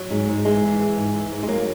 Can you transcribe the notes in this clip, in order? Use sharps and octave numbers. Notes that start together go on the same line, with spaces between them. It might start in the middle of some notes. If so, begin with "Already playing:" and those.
Already playing: F#3
G#2 G#3
G#2
E3 G#3
E3
E3
G#2
E3
G#2
G#3
F#3 A#3